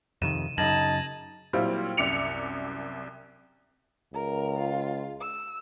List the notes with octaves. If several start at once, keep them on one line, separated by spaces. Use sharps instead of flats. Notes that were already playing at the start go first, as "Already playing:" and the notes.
F2 C3 D#3 D#7 E7
F#2 C#3 D#4 A5 G#6 A#6 F#7
A#2 F#3 G3 C4 E4 F4
C2 F#2 E5 D6 C#7 F7
C#2 A#4 A#5
F4
E6